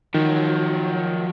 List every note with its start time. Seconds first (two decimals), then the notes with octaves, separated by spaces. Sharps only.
0.14 D#3 F3 F#3